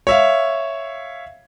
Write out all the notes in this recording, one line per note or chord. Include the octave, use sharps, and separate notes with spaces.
C#5 E5 F5